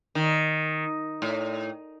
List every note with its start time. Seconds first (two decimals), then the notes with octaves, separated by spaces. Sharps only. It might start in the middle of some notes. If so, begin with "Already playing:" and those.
0.15 D#3
1.22 A2